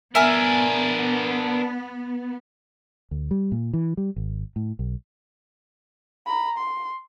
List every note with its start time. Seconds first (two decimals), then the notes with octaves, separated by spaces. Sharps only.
0.15 B3 D4 A#4 E5 G#5 F6
3.11 D2
3.31 G3
3.52 A#2
3.73 E3
3.97 G3
4.16 G#1
4.56 A2
4.79 B1
6.26 A#5 B5
6.58 C6